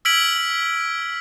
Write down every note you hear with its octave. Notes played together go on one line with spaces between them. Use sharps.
E6 F6 G#6 B6 D7 F#7